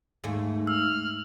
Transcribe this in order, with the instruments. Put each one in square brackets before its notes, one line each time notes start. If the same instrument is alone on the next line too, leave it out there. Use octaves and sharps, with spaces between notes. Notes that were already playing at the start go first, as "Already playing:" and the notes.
[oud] D#2 G#2 A3
[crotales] E6 [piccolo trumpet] F6